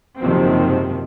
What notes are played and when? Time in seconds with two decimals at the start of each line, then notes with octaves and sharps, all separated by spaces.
0.19 F#1 G#2 C3 D#3 F3 C4